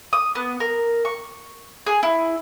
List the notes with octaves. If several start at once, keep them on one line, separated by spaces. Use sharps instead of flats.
D#6
B3
A#4
C#6
G#4
E4